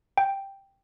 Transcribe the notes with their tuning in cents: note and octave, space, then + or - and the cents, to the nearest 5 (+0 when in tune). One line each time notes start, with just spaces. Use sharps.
G5 +0